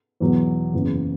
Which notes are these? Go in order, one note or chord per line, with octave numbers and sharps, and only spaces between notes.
E2 B2 F#3
F#1 E2 C#3